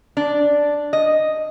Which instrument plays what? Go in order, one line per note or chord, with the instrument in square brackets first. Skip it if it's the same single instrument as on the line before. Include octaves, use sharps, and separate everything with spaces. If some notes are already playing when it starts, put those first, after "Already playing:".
[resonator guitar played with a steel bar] D4
D#5